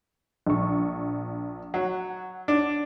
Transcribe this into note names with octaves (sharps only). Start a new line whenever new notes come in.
A#1 C#6
F#3 F#5
D4